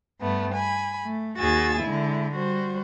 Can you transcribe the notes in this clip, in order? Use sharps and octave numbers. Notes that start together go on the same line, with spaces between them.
G2 A3 B3
G#5 B5
A3
D#2 F#4 G#4 G#5 E6 A6
D3 G#3 E4
G3 F#4 C5